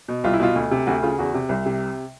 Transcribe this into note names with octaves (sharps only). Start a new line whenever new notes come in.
B2
C2 F4
E4
B2 F4
D2
C3
D2 F#4
C#3 F4
E2 F#4
C3
C2
C3